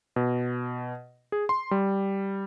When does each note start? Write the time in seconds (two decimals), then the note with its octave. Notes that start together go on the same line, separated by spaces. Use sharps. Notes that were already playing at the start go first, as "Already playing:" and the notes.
0.16 B2
1.32 G#4
1.49 C6
1.71 G3